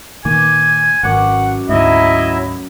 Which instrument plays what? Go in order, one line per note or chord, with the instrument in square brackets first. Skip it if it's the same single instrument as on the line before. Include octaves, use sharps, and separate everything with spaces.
[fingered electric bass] A#2 D#3 A#3 [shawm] G#5 [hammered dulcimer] D6
[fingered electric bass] G#1 [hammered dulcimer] F#2 D6 [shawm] F#5
[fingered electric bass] D2 G#2 [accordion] F#3 E4 E5 [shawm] D#5